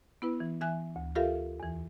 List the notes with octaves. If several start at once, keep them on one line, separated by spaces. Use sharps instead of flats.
B3 E4 B4
E3
E3 E5 G#5 F#6
D2
F4 G4 A4 A#4 E5 F5
E2 E3